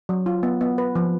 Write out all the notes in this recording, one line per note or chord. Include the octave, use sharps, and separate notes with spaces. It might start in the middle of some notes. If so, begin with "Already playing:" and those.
F#3
F4
B3
B3
B4
F3